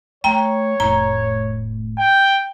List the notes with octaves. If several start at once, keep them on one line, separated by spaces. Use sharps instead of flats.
A3 C#5 G5 A#5
F1 A2 A#5
G5